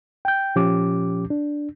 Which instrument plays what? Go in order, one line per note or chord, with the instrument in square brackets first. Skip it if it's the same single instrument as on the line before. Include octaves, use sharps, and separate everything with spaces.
[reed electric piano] G5 G6
A#2 F3 C#4 G4 D6
D4